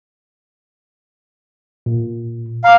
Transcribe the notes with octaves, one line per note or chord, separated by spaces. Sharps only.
A#2
F5 A#5 D6